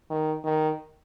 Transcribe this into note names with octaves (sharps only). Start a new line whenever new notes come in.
D#3
D#3